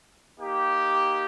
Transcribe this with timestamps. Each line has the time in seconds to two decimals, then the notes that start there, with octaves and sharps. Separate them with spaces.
0.38 A#3 D#4 G4